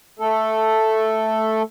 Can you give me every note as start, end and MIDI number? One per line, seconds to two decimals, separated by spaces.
0.19 1.62 57
0.19 1.62 69